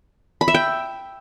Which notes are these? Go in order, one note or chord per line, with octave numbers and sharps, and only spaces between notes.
B5
E5
G5